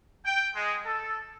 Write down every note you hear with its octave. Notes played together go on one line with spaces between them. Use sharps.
G5
G#3
A4